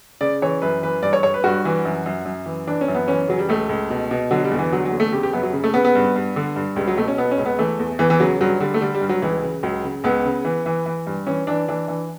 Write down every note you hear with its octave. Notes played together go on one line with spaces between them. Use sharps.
C#3 D5
E3 C#5
F#2 B4
E3 B4
G2 D5
C#5
G2 C#5
B4
G2 F#4
E3
F#2
F#2
F#2
E3
E3 D4
C#4
F#2
B3
E3 C#4
C#3 F#3
G3
C#2 A3
C#2
B2
B2
D3 F#3
G3
E2
E3
D3 F#3
F#3
E2
A3
C#3 G4
G4
F#2 B3
F#3
C#3
A3
C#3 B3
B3
G2
G2
D3
G2
C#2 G3
F#3
B2 A3
C#4
B2 B3
C#4
C#2
B3
E3 A3
E2
E2 E3
E3
C#3 F#3
G2 F#3
D3 G3
A3
D3 G3
G3
G2
F#3
C#2 E3
C#3
C#2 F#3
C#3
C#2 B3
C#3
E3
E3
E3
G2
E3 C#4
E3 D4
E3 D4
E3